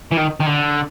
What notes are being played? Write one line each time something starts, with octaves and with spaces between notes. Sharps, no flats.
E3
D#3
D#3
D3